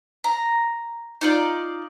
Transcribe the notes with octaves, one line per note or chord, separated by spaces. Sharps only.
A#5
D#4 F4 D5